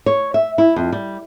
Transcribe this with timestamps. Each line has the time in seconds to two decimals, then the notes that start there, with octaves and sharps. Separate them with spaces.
0.06 C#5
0.34 E5
0.58 E4
0.76 F2
0.92 G3